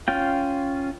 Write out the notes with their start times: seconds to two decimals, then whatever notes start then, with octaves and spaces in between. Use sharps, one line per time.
0.08 C#4 F4 G5